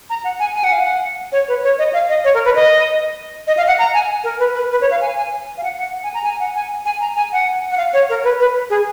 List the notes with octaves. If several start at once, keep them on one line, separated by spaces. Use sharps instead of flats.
A#5
F#5
G#5
G#5
F#5
F5
F#5
C#5
B4
C#5
D#5
F5
D#5
C#5
A#4
B4
D#5
D#5
F5
F#5
A#5
G#5
A#4
B4
B4
B4
C#5
F5
G#5
G#5
F5
F#5
F#5
G#5
A#5
G#5
F#5
G#5
G#5
A#5
G#5
F#5
F#5
F5
C#5
A#4
B4
B4
G#4